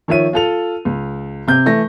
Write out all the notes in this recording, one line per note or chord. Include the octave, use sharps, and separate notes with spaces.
D#3 F3 C#5 E5 D#7
F4 A4 F7
C#2
C3 G6
E3 A3 A#6